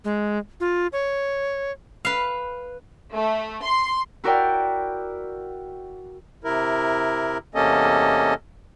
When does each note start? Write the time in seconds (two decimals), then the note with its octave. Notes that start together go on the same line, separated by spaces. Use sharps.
0.04 G#3
0.60 F4
0.93 C#5
2.05 B4 F5
3.13 A3
3.62 C6
4.24 E4 F#4 A#4 D5 G5
6.44 C3 E4 A#4
7.55 E2 C3 A#3 C#4 A4 D#5